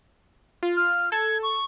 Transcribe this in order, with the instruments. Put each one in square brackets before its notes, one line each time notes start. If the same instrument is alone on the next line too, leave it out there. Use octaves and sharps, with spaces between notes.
[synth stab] F4
[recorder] F6
[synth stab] A4 [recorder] G#6
[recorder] C#6